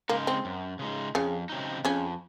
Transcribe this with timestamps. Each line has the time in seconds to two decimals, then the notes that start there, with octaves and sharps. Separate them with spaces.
0.09 C#3 G#3 A#3 D#4
0.27 C4
0.45 F#2
0.79 C#3 G#3 D#4
1.15 F2 C#3 C#4
1.49 C#3 F#3 C4 D#4
1.85 F2 C#3 C#4